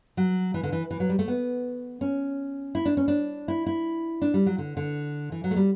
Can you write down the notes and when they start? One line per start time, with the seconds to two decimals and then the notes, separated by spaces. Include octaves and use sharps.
0.17 F#3
0.54 E3
0.63 D3
0.72 E3
0.91 E3
1.00 F#3
1.09 G3
1.19 A3
1.28 B3
2.01 C#4
2.75 E4
2.85 D4
2.97 C#4
3.08 D4
3.48 E4
3.66 E4
4.22 D4
4.34 G3
4.46 F#3
4.58 D3
4.77 D3
5.32 E3
5.44 F#3
5.51 A3
5.56 G3